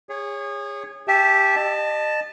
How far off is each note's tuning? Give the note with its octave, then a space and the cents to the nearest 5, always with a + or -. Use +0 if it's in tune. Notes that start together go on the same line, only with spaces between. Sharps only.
G#4 -30 C#5 +0
G4 +0 E5 +0 A5 -25
D#5 -35 A5 +0